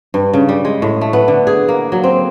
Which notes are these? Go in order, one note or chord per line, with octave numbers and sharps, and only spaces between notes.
G2
C#3
G3
G#3
A2
A3
B3
D3
G#4
A#3
F#3
C4